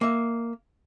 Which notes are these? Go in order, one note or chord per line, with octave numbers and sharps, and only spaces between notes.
A#3 E5